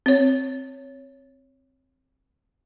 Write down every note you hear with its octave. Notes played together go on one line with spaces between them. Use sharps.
C4 C#5